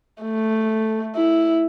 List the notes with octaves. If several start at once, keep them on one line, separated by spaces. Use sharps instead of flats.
A3
E4